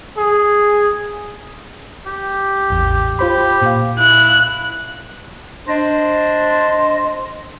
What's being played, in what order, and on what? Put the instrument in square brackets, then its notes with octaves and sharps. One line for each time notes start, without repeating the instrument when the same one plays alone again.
[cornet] G#4
[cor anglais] G4
[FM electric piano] A1 E2
[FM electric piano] F4 C5 B5 [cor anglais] G4
[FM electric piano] A#2 F5
[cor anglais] E4 [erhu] F#6
[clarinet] D4 [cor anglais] C5 [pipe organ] D#5